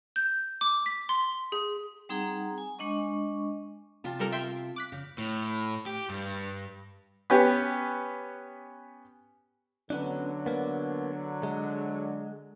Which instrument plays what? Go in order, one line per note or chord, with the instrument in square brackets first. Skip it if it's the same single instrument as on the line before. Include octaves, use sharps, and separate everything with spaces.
[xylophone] G6
D6
B6
C6
G#4
[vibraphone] G3 C4 D#4 G#4 F#5 A#5
G#5
G#3 D4 D#5 C#6
[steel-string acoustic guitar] C3 F4 A5
[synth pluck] G3 A4 A#4
E5 G5 C6
D6 F#6 B6
[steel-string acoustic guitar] C#3
[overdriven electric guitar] A2
G4
G2
[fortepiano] B3 C#4 G4 B4
[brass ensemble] D3 F#3 [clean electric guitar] B3 C#4 D4
[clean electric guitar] A#3 B3
G#3